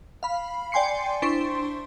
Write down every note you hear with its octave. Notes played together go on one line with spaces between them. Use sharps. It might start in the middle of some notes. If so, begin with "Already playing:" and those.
F5 B5
D5 G5 G#5 C6 C7 C#7
D4 E4 C5 C6 C#6